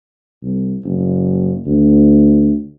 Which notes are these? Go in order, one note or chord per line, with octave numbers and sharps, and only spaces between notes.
C2
F#1
D2